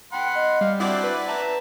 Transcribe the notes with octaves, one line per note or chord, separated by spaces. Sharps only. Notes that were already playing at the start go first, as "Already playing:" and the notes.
F#5 G5 B5 C6
D#5
G3 F5
C4 D4 E4 F#4 D5 F#5
B4
E5 A5 A#5